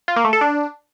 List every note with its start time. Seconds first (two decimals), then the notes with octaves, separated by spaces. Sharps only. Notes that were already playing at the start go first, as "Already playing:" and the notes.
0.08 F4
0.16 A#3
0.25 A3
0.33 A4
0.41 D4